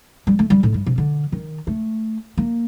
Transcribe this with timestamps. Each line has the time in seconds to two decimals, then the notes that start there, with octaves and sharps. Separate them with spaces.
0.27 G3
0.39 A3
0.50 G3
0.63 A2
0.74 G2
0.86 C3
0.98 D3
1.32 D#3
1.67 A3
2.37 A#3